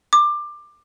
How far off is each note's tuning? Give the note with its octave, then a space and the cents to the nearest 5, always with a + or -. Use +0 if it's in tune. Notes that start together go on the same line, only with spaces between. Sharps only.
D6 +20